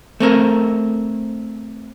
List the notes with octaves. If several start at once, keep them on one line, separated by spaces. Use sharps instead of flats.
A3 C4 A#4